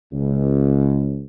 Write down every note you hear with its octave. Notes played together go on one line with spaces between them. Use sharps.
C#2